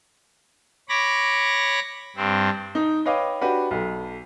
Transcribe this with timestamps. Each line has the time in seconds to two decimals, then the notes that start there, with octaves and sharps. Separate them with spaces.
0.89 C#5 B5 D6 A#6
2.16 G2 C4
2.75 D#4
3.06 B4 C#5 D#5 F5 G5 D6
3.42 D4 F#4 G4 B4
3.71 B1 A4